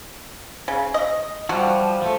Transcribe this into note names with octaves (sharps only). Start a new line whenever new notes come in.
C#3
D#5
F3 G3 F#4
F3 A3